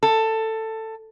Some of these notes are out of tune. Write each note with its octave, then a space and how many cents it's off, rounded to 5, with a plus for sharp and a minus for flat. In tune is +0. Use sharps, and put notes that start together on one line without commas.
A4 +15